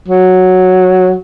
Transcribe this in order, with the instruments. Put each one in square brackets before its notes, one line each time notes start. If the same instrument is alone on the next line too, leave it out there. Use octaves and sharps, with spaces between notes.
[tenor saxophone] F#3